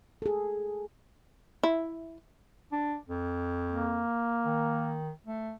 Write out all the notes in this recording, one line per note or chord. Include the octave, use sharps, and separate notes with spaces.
G#4 A4
E4
D4
F2
A#3
D#3
A3